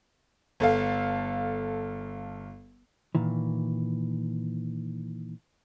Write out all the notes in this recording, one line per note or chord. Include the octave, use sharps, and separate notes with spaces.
G1 A4 F5
A#2 D#3 E3